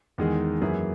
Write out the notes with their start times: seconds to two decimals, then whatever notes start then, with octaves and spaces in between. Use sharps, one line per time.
0.18 E2 D#3 G#3 D#4 G#4
0.61 F#2 E3 A#3 E4 G#4